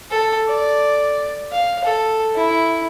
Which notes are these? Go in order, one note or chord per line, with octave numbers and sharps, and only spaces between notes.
A4
D5
F5
A4
E4